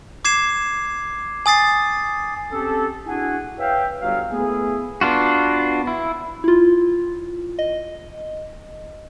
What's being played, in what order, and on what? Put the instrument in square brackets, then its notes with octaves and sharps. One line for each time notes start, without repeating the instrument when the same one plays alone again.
[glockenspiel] D6 G#6 C7 E7
G#5 D#6 A6 C7
[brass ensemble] C4 C#4 G4 A4
D4 E4 F#4 G#4 F#5 G#5
B4 C#5 E5 F5 G5
G1 F#3 F5
A3 B3 E4 G#4
[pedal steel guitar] B3 D4 F4 F#4
E4
[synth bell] E4 F4
D#5